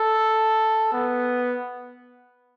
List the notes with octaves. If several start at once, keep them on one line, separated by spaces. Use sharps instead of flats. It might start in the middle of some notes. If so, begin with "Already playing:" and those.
Already playing: A4
B3